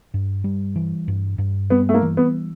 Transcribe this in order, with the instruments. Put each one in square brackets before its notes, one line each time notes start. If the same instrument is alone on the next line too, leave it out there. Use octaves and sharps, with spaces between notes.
[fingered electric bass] G2
G3
E3
G2
G2
[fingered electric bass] G3 [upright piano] B3
[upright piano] A3
A#3
[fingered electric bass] E3
[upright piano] B3